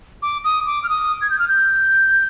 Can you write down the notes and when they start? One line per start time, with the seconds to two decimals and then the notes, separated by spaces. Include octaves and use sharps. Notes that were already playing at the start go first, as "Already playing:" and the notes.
0.22 D6
0.44 D#6
0.67 D6
0.84 F6
0.89 D#6
1.22 G#6
1.30 G6
1.39 F6
1.48 G6